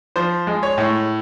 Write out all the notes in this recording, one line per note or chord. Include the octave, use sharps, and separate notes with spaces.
F3 C5
G#3
C#5
A2